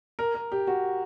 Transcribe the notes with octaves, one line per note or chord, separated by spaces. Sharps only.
A#4
A#4
G4
F#4